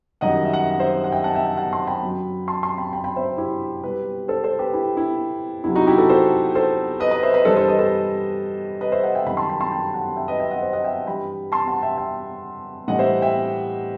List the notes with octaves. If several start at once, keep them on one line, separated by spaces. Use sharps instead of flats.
F#2 D#3 G3 D#5 F#5
E5
F#5
E5
F#5
C5 E5
F#5
E5 G5
F#5 A5
E5 G5
E5 G5
F#5 A5
A5 C6
G5 B5
F#2 F#3
A5 C6
A5 C6
G5 B5
G5 B5
G5 B5
C5 E5
E4 G4
B2 G3 G4 B4
A4 C5
A4 C5
G4 B4
E4 G4
E4
E2 C3 F#3 E4
D#4 F#4
E4 G4
F#4 A4
A4 C5
A4 C5
B4 D#5
B4 D#5
C5 E5
B4 D#5
G2 E3 G3 A4 C5
A4 C5
B4 D#5
A4 C5
B4 D#5
C5 E5
D#5 F#5
E5 G5
F#2 D#3 G3 G5 B5
A5 C6
G5 B5
A5 C6
G5 B5
F#5 A5
E5 G5
B4 D#5
E5 G5
D#5 F#5
C5 E5
D#5 F#5
E5 G5
G2 E3 G3 G5 B5
A5 C6
F#5 A5
E5 G5
E5 G5
A2 E3 G3 D#5 F#5
C5 E5
E5 G5